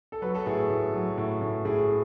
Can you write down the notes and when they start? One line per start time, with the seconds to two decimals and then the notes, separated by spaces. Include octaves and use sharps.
0.12 A4
0.22 F#3 B4
0.35 A4
0.46 A2 G#4
0.69 A2
0.93 F#3
1.18 A2
1.41 A2
1.65 A2 G#4